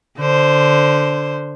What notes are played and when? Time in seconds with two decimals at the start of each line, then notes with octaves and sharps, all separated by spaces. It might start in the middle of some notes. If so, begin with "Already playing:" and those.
0.18 D3 C5